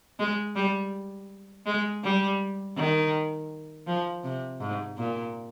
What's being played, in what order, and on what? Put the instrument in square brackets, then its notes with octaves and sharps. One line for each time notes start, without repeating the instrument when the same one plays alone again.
[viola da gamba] G#3
G3
G#3
G3
D#3
F3
C3
G#2
A#2